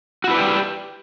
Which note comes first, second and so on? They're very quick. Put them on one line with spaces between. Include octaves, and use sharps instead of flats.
F#4 E4 B4 D5 G4